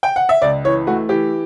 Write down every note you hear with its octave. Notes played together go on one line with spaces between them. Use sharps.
G5
F#5
E5
C#2 D5
E3 C#5
A3 F#4
E3 G4